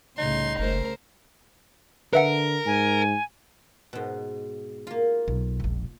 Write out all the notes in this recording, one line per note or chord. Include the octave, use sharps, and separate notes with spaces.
C2 A2 C#3 D#4 C6
F#1 C#3 A3 A#4 C5
D3 A#4 B4 E5 F#5
G#2 G#5
G#2 B2
A#3 F4
B1
E1 A#1